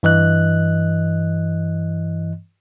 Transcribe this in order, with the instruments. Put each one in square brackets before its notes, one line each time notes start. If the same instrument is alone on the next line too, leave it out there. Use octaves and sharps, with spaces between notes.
[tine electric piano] G2 E3 D#5 F#6